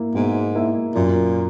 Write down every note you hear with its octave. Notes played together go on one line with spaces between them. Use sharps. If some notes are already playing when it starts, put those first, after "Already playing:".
Already playing: A#3 E4
G#2 B2
A#3 E4
F#2 A#2